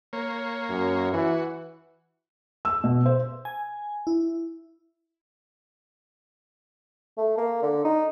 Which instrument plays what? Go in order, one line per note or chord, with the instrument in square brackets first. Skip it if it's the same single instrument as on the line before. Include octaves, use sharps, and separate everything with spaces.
[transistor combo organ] A#3 C#5
[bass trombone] F#2
[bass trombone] E3 [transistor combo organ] F#4
[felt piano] E6
B2
C5
[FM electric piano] G#5
E4
[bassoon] A3
A#3
D3
D#4